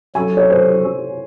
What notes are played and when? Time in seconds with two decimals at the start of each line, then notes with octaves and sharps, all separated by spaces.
0.15 F#3 C#4 F#4 A4 G#5
0.37 C#5
0.50 C5